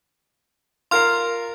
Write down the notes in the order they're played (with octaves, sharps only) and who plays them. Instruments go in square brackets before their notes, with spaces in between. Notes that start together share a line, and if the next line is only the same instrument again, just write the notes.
[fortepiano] F4 A#4 F5 [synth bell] C6 F6